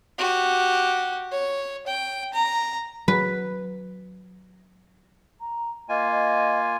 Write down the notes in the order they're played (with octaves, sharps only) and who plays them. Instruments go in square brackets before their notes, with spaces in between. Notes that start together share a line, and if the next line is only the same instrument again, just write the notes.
[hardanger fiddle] F#4 G4
C#5
G5
A#5
[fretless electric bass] F#3 [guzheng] B4
[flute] A#5
[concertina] A#3 F4 G#5 [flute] D#5
[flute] D#5